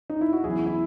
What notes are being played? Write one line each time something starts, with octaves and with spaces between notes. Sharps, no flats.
D#4
E4
F#4
E2 C#3 F#3 E4 G#4
E4